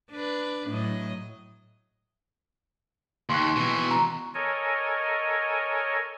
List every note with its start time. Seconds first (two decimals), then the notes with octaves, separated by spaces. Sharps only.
0.11 D4 B4
0.68 A2 F#3 D#5
3.29 D#2 C6 C#6 F#6
3.56 B2 E3
3.91 A#5
4.34 A4 A#4 C#5 D#5 G#5